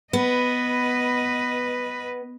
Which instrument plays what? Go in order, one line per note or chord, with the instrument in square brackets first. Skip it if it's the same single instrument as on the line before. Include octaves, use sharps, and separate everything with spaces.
[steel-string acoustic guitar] B3 [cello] B4 D#5